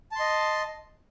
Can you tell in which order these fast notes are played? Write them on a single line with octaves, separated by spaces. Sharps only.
A5 C6 D#5